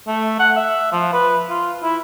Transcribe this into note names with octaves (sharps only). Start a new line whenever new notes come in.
A3
F#5
E5
F3
B4
F4
E4